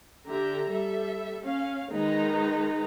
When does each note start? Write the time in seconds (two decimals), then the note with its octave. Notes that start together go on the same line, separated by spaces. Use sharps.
0.27 D3 G4 E5 A#5
0.72 G3 A4 E5
1.43 C#4 F5
1.92 D#3 G#3 D#4 B4 A#5